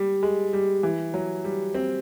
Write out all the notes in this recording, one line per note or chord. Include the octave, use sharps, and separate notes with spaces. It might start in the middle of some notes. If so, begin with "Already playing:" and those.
Already playing: G3
G#3
G3
E3
F#3
G3
C4